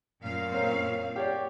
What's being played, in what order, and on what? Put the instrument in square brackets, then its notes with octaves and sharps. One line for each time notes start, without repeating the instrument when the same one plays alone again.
[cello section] F#2 A#2 F5
[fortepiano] C4 C#4 A#4
G4 C#5 D5